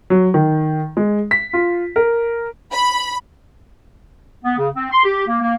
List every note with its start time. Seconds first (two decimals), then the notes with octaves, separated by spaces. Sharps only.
0.10 F#3
0.34 D#3
0.97 G#3
1.31 B6
1.53 F4
1.96 A#4
2.71 B5
4.43 B3
4.58 C#3
4.74 C4
4.91 C6
5.04 G4
5.27 A#3
5.42 A#3